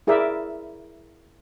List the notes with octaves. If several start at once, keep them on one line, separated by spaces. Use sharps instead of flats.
E4 G#4 A#4 D5 E5